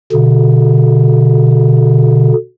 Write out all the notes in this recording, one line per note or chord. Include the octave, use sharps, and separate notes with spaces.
B2 D3